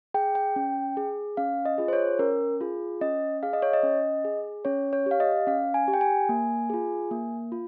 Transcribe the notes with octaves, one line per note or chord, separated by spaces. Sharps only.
G#4 G5
G5
C#4
G#4
C#4 F5
D#5
F4 G#4
C5
C#5
C#4 A#4
F4 G#4
C#4 D#5
G#4 F5
D#5
C#5
D#5
C#4
G#4
C#4 C#5
C#5
G4 F5
D#5
C#4 F5
G#5
G4
G5
G#5
A#3
F4 G#4
A#3
F4